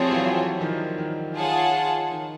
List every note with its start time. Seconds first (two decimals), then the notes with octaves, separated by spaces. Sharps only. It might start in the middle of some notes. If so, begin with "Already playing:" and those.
Already playing: F3 G3 A3 C4 F4 G#4 C#5
0.11 E3 F#3
0.61 D#3 F3
0.98 D#3
1.36 F4 G#4 C#5 F#5 A5
2.12 D#3